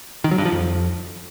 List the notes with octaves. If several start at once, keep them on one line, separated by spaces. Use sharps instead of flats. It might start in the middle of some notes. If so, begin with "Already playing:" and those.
D#3
F#3
G2
F3
F2